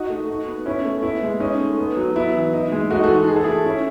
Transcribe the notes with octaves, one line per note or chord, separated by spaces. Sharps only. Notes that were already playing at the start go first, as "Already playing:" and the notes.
Already playing: D#4 F#4
A3
D#4
B3
C#4 E4
A3
B3 E4
G#3
C#4 D#4
A3
B3
F#3
B3 E4
E3
D#4
G#3
A3 D#4 F#4
F#4 A4
E3
D#4 G#4
A4
A3 E4 G#4
C#4 E4